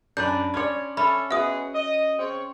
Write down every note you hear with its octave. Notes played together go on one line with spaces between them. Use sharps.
F#2 D4 B4 D5 G6
C#4 C#5 D5 C6 G#6
C#4 A4 E5 A5 B5
G#3 B3 F#4 G#4 E5 D#6
D#5
C#3 C4 C#5